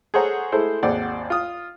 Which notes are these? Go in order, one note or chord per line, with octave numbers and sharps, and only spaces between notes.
G#4 A4 C5 C#5 F#5 A#5
G#3 A3 E4 A4 C5
G#1 D#2 C5 D5 F#5
F4 D#6